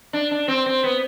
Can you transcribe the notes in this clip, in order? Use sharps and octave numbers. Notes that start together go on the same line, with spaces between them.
D4
D4
C4
C4
B3